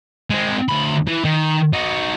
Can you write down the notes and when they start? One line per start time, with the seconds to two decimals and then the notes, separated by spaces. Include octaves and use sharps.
0.30 G#3 C4
0.69 D2 B5
1.07 E3
1.25 D#3
1.73 D#4 F#4